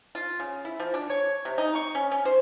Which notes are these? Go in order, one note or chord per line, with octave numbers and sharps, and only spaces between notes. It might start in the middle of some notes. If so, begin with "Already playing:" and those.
F4
C#3
E4
F3
D4
C#5
C3
D#4
C#6
C#4
C#4
C5